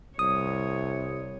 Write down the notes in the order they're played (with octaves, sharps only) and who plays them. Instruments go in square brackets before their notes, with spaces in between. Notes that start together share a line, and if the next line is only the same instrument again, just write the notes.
[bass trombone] C2 [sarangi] C#5 [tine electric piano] D#6